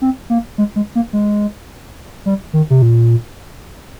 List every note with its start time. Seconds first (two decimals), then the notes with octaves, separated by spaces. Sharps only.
0.02 C4
0.30 A#3
0.58 G#3
0.76 G#3
0.95 A#3
1.13 G#3
2.26 G3
2.53 D#3
2.70 C3
2.82 A#2